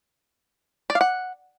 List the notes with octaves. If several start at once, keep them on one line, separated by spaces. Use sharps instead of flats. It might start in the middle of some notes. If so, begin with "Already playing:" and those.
D5
F5
F#5